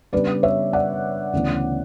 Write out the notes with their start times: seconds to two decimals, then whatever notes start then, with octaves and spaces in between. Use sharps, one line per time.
0.13 C#3 G3 B3 D4 B4 D5
0.43 C#5 E5
0.73 D5 F#5
1.33 D2 C#3 E3 B3